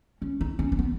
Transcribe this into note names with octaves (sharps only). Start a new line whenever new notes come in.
C#4
D#4
C#4
C#4
B3